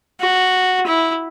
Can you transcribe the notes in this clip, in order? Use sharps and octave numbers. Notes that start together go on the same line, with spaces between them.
F#4
E4